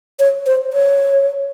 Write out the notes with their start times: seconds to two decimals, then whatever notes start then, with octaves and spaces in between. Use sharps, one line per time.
0.19 C#5
0.46 C5
0.73 C#5